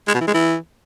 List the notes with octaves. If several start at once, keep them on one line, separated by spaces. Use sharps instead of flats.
G#3
B2
E3
G#3
E3